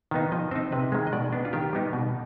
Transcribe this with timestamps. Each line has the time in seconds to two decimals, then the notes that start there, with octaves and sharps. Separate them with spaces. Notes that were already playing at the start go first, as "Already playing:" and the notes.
0.11 D#3 B3 D#4
0.32 F3 D#5
0.51 C4 D#4 C5
0.72 C3 B4
0.92 D#3 G#3
1.07 D#5
1.13 B2 D5
1.33 B3 D4
1.45 F4
1.53 D#3 G4
1.73 G3 B3 D#4
1.93 B2